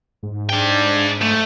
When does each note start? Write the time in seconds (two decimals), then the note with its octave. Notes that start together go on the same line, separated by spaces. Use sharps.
0.23 G#2
0.50 D4 G5
1.22 A3